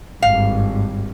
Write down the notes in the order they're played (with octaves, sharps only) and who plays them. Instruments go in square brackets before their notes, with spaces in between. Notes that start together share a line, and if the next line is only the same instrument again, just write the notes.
[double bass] G#1 G2 [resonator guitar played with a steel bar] F5